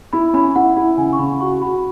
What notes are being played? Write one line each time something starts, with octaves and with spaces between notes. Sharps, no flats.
E4 B5
C#4 B5
E4 F#5
E4
C#3 G#5
C#6
C#3 B5
F#4 C#6
F#4 B5